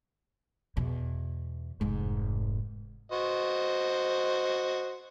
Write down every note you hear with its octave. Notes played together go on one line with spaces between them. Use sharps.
E2 B2
F1 G#2
F#4 C5 D#5